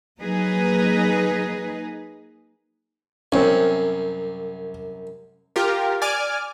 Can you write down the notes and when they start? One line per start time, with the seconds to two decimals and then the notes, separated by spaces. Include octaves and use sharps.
0.20 F#3 A#3 D#4 G#4 B4 D#5
3.32 C2 F#2 C4 C#4
5.56 F4 G4 A#4
6.02 D5 G#5 D6 F6